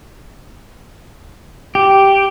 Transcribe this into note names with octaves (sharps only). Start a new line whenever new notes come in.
G4